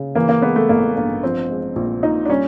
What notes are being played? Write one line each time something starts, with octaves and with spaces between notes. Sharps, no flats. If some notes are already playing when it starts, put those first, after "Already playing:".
Already playing: C#3
E3 A#3
A#3
G#3 B3
A3
A1 A#3
G2 A#3
F3 C4
G#3
A#1
A#2 D#4
D4
G3 C#4